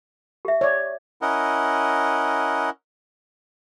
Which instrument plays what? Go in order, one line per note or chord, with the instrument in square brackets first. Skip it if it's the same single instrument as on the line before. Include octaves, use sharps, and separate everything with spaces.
[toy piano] G4 E5
[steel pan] C#5 D5
[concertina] C#4 E4 A#4 D#5 F#5